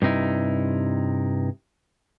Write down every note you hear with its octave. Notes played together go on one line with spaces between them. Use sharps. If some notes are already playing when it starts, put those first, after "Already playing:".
G2 C3 D#4 E4